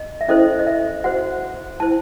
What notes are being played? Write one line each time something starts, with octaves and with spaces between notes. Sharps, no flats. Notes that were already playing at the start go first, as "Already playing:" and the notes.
Already playing: D#5
E5
C#4 E4 A4 C5 D#5
D#5
E5
F#4 C5 F#5
E4 C5 A5